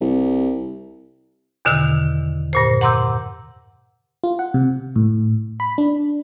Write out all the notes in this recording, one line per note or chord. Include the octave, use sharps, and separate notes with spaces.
C2
E2 B2 D3 D#3 E6 F#6
G2 A#2 C5
F#5 A#5 C6 D6 E6 G6
F4
F#5
C3
A2
B5
D4